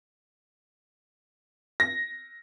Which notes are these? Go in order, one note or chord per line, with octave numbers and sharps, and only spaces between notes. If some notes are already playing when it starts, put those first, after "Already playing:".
A#6